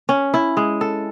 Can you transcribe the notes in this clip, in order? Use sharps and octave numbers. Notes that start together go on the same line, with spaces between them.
C#4
E4
G#3
A4